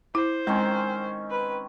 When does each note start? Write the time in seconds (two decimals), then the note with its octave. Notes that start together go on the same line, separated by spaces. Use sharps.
0.15 E4 C5
0.47 D#3 G#3 C4 C#4
1.30 B4